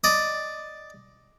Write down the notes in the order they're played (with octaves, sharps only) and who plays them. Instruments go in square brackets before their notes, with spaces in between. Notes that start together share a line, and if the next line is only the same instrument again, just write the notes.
[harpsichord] D5 D#5